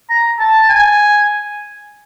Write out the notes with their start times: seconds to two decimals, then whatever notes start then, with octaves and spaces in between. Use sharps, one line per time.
0.10 A#5
0.40 A5
0.70 G#5